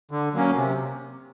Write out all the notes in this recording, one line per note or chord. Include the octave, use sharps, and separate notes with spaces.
D3
F#3 A#3 C#4
C3